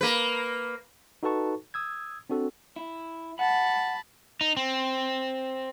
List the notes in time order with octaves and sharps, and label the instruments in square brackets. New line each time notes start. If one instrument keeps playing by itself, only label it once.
[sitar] A#3 B4
[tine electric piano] D#4 F#4 A4 B4 A5 C#6
D#6 E6 G#6
C4 D4 F#4 A4
[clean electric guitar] E4
[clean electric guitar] F#5 [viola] A5 B5
[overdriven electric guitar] D#4
C4